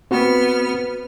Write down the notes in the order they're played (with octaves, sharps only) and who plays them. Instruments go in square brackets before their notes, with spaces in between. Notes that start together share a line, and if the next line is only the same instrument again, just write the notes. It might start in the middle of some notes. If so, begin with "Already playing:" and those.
[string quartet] B3 F6 [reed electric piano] C4 F#4